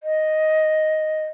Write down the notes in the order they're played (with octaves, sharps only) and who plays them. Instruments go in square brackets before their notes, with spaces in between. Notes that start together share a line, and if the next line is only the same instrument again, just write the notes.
[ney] D#5